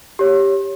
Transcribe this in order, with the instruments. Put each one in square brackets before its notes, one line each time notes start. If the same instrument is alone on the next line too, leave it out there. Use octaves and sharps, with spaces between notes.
[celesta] G4 C#5